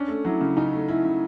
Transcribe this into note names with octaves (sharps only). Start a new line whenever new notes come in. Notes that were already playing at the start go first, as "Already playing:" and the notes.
Already playing: C#4 D4
A3
F#3 E4
C#3
C#3 D#4
A3
A3 E4
C#3